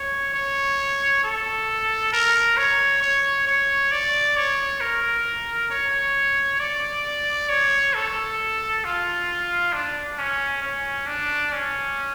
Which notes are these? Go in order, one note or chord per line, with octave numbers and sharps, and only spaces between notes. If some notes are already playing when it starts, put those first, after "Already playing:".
Already playing: C#5
C#5
A4
A#4
C#5
C#5
C#5
D5
C#5
A#4
C#5
D5
C#5
A4
F4
D4
C#4
C#4
D4
C#4